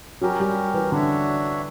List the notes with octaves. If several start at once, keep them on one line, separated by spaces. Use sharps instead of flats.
F#3 C#4 G4 A#4
G3
E3
D3 D4 F#4 C#5 E5